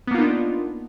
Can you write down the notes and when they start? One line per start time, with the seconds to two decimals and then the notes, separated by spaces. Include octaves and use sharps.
0.07 B3
0.11 A#3
0.15 F4
0.18 D#4
0.22 D4